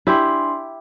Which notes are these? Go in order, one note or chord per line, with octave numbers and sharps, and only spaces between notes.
D4 E4 G4 C6